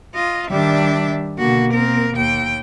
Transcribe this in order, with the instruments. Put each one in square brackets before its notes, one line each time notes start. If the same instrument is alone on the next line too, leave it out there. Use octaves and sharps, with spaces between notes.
[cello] F4 D#5
[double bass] D#3 G3 [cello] D4 E5
[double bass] B2 A#3 [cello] D3 F#4
[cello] C4 A#4
D#2 G5